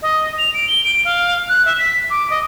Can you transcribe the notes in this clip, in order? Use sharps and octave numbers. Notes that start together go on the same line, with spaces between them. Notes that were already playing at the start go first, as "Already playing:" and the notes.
D#5
F7
D7
G7
D7
F5
F#6
E5
B6
D6
D#5